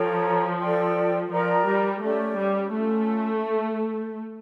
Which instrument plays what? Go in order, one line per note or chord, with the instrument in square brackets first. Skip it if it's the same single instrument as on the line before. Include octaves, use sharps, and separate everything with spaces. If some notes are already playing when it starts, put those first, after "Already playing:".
Already playing: [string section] F3 [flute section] A4 C#5 G5 A#5
[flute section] A4 D5 G5
[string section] F3 [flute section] A#4 D5 G5 A#5
[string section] G3
[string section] A3 [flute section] C#4 G4 D5
[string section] G3
[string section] A3 [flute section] C#4 F4 A4